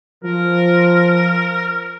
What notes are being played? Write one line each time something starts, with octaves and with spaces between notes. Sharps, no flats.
F3 A#4